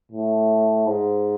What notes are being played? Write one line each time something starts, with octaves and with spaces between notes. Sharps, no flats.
A2
G#2